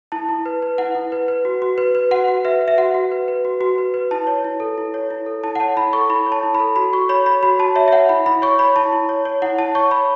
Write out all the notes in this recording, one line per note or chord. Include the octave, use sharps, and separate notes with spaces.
E4 A5
E4
B4
B4
E4 F#5
E4
B4
B4
F#4
F#4
B4
B4
F#4 F#5
F#4
B4 E5
B4
E5
F#4 F#5
F#4
B4
B4
F#4
F#4
B4
B4
E4 A5
C#5
E4
A4
E4
C#5
E4
A4
E4 A5
F#5
C#5 A5
E4 B5
A4 C#6
E4 B5
C#5
A5
E4
B5
A4
F#4 B5
F#4 C#6
C#5 B5
C#5 B5
F#4 B5
F#4 A5
C#5 E5
E5
C#5 F#5
E4 B5
E4 B5
C#5 C#6
C#5 B5
E4 A5
E4
C#5
C#5
E4 F#5
E4 A5
C#5 C#6
C#5 B5